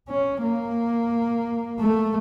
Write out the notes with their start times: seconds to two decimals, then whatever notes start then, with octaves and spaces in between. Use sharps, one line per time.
0.09 C#4
0.43 A#3
1.80 A3